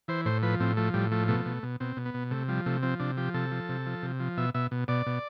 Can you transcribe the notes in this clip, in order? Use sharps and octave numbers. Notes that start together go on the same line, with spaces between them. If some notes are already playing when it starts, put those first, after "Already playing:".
E3 C5
A2 C5
F3 B4
A2 C4
F3 A3
A2 G3
F3 A3
B2 A3
B2
B2
B2 C4
B2
B3
B2
C3 A3
F3 G3
C3 A3
F3 C4
C3 D4
F3 G4
C3 A4
F3
C3
F3
C3
F3
B2 E5
B2 E5
B2
B2 D5
B2